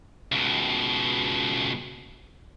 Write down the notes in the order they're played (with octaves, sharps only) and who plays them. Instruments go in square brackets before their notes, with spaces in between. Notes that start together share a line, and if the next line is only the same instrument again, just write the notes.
[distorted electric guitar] C#2 B2